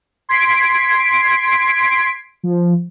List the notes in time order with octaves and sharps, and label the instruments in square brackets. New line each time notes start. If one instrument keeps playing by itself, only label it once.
[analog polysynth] C6 G#6 B6 C7 D7
F3